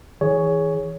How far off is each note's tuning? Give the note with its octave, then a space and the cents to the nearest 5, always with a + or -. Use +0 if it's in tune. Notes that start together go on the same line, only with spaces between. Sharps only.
E3 -30 G#4 +0 C#5 +10